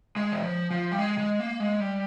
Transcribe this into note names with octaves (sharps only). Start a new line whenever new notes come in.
G#3
E3
F3
F3
G3
G#3
G#3
A#3
G#3
G3